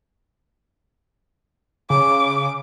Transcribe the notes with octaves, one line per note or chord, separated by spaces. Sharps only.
C#3 D6